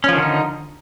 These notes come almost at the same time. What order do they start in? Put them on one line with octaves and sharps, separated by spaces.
C#4 F3 D#3 D3 D#4